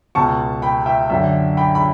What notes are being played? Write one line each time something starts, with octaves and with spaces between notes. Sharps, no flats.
C#2 B2 A5 C#6
G5 B5
E5 G5
F#2 D3 E5 G5
G5 B5
B5